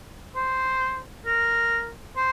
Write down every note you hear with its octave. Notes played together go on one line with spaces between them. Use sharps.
C5
A#4
C5